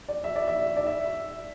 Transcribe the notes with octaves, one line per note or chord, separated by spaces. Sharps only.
D5
E5
D5
E5
D5
E5